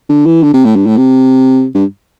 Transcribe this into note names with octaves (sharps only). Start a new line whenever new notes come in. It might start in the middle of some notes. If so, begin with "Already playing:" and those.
D3
E3
D3
C3
A2
G2
A2
C3
G2